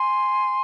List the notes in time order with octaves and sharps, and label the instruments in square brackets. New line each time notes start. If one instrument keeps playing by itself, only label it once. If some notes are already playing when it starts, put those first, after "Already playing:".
Already playing: [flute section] G#5 C6